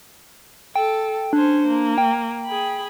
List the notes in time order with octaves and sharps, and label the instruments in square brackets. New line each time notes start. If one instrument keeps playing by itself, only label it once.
[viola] A4 [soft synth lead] G5
[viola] C#4 C5 [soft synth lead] D4
[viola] A#3
[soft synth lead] G5
[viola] G#4 B5